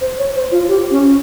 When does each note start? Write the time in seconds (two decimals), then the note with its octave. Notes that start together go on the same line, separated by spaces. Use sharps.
0.01 C5
0.18 C#5
0.35 C5
0.51 F4
0.68 G4
0.91 C#4